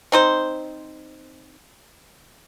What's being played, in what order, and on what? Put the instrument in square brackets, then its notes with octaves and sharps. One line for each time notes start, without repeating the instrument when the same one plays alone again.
[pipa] C4 D#4 C5